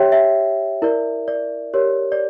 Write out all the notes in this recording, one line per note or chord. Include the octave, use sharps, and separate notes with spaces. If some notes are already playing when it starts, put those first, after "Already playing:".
Already playing: G4 C#5 E5 G5
E5
E4 A#4 D5
D5
G4 A#4 C#5
D5